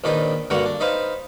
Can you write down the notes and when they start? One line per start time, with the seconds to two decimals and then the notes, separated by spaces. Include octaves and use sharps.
0.04 A#1 D#3 D4 D#4 B4
0.50 G2 D3 A#3 F#4 F#5 A#5
0.66 D4
0.80 D#4 B4 C5 F5